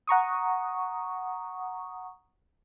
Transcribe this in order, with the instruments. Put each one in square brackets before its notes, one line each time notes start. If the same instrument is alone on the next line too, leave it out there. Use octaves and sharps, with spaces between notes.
[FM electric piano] F#5 A#5 C#6 D#6